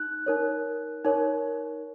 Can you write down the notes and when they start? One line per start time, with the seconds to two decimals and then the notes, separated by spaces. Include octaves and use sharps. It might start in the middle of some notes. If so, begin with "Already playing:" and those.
Already playing: D#4 F#6
0.26 D#4 A#4 C#5
1.05 D#4 A#4 C#5